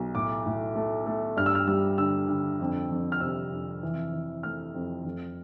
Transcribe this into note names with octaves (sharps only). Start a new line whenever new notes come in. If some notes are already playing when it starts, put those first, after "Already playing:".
Already playing: B1
A2 D6
A2
A3
A3
G2 F6
E6
F6
G3 E6
D3 E6
D3
F2
F2
F6
C3 E6
F2
E3
E3
A3 F6
F2
F2